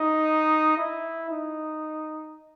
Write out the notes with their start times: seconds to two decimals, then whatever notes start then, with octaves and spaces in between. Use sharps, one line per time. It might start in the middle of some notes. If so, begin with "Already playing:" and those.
Already playing: D#4
0.78 E4
1.31 D#4